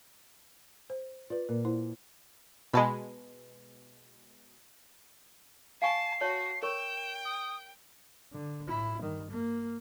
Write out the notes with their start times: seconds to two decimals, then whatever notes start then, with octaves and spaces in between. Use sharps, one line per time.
0.90 C5
1.30 F4 B4 D5
1.49 A#2 A#4
1.65 A#3 E4 C5
2.74 B2 G#3 B4 A5 B5
5.82 F5 G#5 A5 C#6 C7
6.21 F#4 C#5 A5
6.63 A#4 C#5 G5 C#6 E7
7.25 D#6
8.33 D3
8.68 A2 E4
9.00 G2 D#3
9.30 A#3